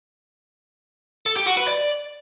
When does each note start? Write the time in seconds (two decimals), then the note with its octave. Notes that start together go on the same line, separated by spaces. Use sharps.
1.26 A4
1.36 G4
1.47 F#4
1.57 B4
1.68 D5